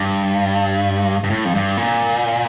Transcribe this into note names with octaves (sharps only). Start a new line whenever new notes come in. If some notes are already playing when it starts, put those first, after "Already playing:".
Already playing: G2
G2
A2
F2
G2
A#2